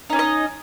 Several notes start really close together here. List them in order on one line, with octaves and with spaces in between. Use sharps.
D#4 C#4 D5 D#5